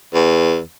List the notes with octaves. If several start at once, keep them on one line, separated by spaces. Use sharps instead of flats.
E2